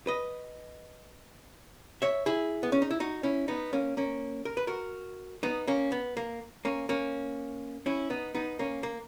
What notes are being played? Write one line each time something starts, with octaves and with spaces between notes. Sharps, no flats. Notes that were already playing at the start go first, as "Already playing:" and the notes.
B4 D#5
C#5 E5
E4 G#4
B3
C#4
D#4
E4
D#4 F#4
C#4 E4
B3 D#4
A#3 C#4
A#3 C#4
A#4
B4
F#4 A#4
B3 D#4
A#3 C#4
B3
A#3
A#3 C#4
A#3 C#4
C#4 E4
B3 D#4
B3 D#4
A#3 C#4
A#3